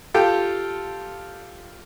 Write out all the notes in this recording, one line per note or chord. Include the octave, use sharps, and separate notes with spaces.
F4 G4 A4 G5